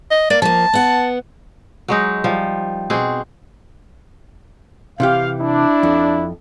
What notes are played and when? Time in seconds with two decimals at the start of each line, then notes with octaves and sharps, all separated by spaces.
0.10 D#5
0.30 A#3 D5
0.42 F3 A#3 A5
0.73 B3 F#5
1.88 F#3 G#3 D#4
2.24 F3 G3
2.90 B2 C4 G#4
5.00 C3 E3 G4 F5
5.41 D4 E4
5.83 F2